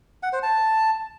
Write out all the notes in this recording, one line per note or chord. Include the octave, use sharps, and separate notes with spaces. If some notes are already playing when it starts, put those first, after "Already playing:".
F#5
C5
A5